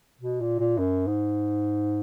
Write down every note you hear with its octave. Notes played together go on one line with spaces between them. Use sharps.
B2
A#2
A#2
F#2
G#2